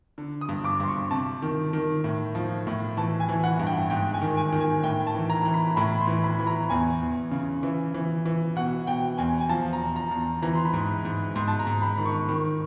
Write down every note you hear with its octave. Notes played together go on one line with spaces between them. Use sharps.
D3
D#6
G2
D6
G2 C6
C#6
C3 A5
D#3
D#3
A2
F3
A2
E3 A5
G#5
E3
F#5
G2
G5
G#2 G5
G#5
D#3
G#5
D#3
G#5
A2 G5
A5
E3
A#5
E3
B5
A2 B5
C6
E3
B5
E3
A#5
E2 G#5
E2
C#3
E3
E3
E3
B2 F#5
B2 G5
E2 G#5
G#5
F3 A5
A#5
E2
A#5
E2
E3 A#5
C6
B5
G#2
G#2
G#2 C6
A5
A#5
G#2
B5
D#3
C#6
D#3